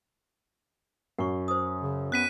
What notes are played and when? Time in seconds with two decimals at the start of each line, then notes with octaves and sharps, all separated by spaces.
1.18 F#2 F#5 C#6
1.48 C5 D#6
1.81 C#3
2.12 B3 C#4 F#6 B6 D#7